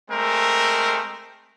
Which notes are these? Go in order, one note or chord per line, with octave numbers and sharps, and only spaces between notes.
G#3 A3 C4 A#4